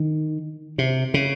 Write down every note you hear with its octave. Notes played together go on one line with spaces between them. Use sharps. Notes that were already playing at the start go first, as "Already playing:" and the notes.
Already playing: D#3
C3
C#3